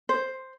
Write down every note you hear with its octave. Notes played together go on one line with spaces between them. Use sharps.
C5